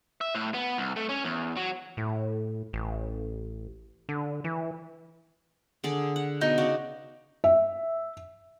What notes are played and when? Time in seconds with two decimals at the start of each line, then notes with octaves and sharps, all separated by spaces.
0.21 E5
0.35 A2
0.54 B3
0.78 C2
0.96 A3
1.09 C#4
1.24 E2
1.57 F#3
1.97 A2
2.73 A1
4.09 D3
4.44 E3
5.84 D3 G#4 D5
6.16 F#5
6.41 B2 D#4
6.58 C#3 F#4 D5
7.44 E5